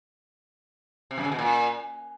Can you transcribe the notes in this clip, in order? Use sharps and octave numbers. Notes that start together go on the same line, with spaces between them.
C3
F#2
C#3
B2
A#2